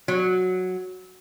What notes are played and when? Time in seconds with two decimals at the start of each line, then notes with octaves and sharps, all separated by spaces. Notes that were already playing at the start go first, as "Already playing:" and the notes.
0.08 F#3